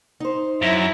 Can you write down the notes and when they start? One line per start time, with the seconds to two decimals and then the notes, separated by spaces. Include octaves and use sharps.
0.20 D#4 C5
0.62 F#2 E4